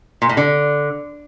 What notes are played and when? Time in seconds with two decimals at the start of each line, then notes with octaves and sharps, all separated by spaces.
0.22 A#2
0.29 A2
0.37 D3